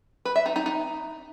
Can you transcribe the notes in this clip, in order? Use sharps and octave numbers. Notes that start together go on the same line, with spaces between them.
B4
E5
D#4
D#4
D#4